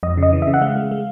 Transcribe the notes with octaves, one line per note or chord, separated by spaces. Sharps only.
F2 D#5
C#3 D#5
E3
C#3 E5
F#5
G#3 F5
G#3
G#3